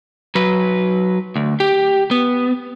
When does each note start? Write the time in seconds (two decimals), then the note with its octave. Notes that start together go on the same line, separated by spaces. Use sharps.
0.35 F#3 B4
1.36 D2
1.60 G4
2.11 B3